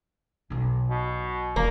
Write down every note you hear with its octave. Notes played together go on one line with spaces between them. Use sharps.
B1 D#4
B2
E1 A#3